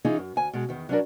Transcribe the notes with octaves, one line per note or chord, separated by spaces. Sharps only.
E3 C#4 D#4 F4 G#4 C#5
F#2
D2 G#5
B2 G#3
E2 D#3
F#3 C#4 D4 A#4